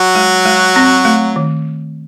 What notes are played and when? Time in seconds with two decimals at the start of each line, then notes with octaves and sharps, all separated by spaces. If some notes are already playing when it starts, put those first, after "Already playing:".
Already playing: F#3 F#4
0.15 G#3
0.45 G#3
0.76 C4
1.05 A3
1.36 D#3